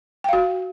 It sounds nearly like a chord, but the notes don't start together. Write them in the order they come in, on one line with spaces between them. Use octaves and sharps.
G5 F5 F#4